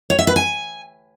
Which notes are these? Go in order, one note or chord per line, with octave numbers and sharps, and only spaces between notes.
C#5
E5
B4
G#5